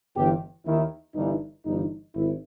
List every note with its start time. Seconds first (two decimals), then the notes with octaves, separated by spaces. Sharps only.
0.16 G1 G2 E3 G4
0.66 D#2 D#3 E4
1.15 G1 G2 E3 D#4
1.65 G1 G2 E3 D#4
2.14 G#1 E4